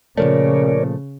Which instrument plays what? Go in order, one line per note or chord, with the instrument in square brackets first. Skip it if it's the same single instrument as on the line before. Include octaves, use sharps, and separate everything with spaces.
[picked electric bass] A#2 F3 A3 [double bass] C#3 [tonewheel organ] A#4 C#5 D5